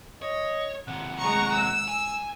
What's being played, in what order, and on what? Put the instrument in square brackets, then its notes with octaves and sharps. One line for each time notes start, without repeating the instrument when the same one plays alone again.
[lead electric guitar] C#5 [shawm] D#5
[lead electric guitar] D#2 C3 [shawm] F#5
[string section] G#3 A#5 C#6
E6
[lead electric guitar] G#5